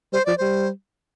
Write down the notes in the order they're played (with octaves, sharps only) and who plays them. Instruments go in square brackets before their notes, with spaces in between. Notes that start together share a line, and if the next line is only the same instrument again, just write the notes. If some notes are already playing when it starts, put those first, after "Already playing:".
[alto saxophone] G3 [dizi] C5
[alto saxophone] F3 [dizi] D5
[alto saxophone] G3 [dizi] C5